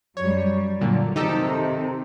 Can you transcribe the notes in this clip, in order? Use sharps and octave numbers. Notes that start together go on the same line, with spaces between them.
F#2 G3 C#5
A#2 D3 F#3
C3 D#3 D#4 G4 A4